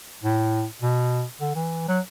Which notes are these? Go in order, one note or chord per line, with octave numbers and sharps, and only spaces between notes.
A2
B2
D3
E3
F#3